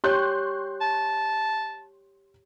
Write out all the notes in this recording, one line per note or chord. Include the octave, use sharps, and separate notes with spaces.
G4 C#5 C6 F#6 G6
A5